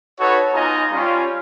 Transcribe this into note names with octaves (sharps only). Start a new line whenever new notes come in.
D#4 F#4 A4 B4 C#5
B3 D#4 F4 D#5 G#5 A#5
G3 C#4 F4